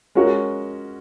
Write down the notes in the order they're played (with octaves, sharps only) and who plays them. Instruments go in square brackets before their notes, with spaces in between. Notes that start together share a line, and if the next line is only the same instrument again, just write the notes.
[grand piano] G#3 C#4 F#4 A#4